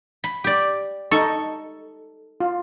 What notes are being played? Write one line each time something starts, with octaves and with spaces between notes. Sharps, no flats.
B5
G4 D5
D#4 A4 C#6
F4